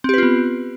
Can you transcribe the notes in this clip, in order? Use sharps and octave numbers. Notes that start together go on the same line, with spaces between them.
B3 C4 F4 G4 B4